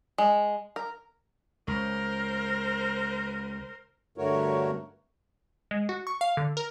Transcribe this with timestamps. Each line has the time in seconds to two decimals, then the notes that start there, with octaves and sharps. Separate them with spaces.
0.18 G#3
0.76 A#4
1.68 C#2 A#4 C5
4.18 G2 D3 A3 F#4 A#4 C#5
5.71 G#3
5.89 F#4
6.07 C#6
6.21 F5
6.37 D3
6.57 A#4